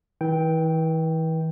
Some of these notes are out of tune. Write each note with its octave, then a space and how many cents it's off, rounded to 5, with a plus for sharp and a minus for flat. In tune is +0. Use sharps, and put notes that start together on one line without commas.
E3 -35 G5 +0